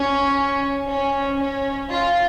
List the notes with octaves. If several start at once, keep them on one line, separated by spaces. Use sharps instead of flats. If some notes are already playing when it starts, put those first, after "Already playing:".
Already playing: C#4
C#4
C#4
F4